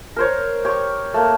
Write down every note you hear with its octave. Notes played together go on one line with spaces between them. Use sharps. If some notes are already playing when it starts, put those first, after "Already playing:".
A#4 C5 C#5
G4 C#5 C#6
A3 A#3